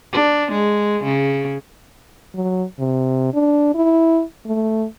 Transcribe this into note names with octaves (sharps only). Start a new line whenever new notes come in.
D4
G#3
C#3
F#3
C3
D4
E4
A3